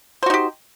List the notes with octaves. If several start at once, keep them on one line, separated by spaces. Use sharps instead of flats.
D#4 F#4 G4 C5